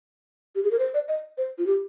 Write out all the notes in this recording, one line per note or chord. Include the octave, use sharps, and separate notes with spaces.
G4
G#4
A#4
C5
D5
D#5
C5
F4
G4